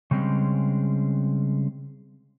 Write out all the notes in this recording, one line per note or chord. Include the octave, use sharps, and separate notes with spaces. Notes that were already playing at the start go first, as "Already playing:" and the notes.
C#3 G3 G#3 C4 C#4